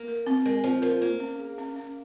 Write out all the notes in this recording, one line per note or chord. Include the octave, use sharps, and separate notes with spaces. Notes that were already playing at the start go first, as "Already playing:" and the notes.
Already playing: A#3
A#4
C4
G#3 A#4
F3 C4
F3 A#4
A#3 C5
C#4
G#4
C#4
C#4